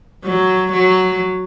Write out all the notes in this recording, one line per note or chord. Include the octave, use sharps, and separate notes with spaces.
F#3
F#3